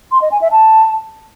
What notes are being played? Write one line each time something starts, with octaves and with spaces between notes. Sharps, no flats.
C6
D#5
G#5
E5
A5